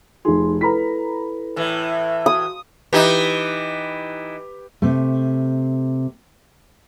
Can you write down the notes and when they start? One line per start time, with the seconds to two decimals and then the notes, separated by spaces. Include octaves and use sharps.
0.25 F1 D#4 G#4 C6
0.61 E4 A4 B4 A#5 B5 B6
1.56 A2 E3
2.26 F#4 D#6
2.93 E3 D#4 G4 B4
4.82 C3 A3